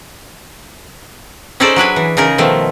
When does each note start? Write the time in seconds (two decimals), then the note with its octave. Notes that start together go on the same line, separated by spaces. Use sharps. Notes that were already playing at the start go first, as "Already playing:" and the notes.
1.60 C#4 D#4 G#4 A4 C5 D5
1.76 F#3 D4 B4 G#5
1.96 E3
2.17 C#3 D#4 G#4 A#4
2.38 B2 D#3 F3 A3